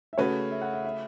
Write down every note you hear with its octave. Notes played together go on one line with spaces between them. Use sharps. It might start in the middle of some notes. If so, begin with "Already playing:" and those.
E5
C#3 A3 F#4 B4 C#5
E5
F#5
E5
E5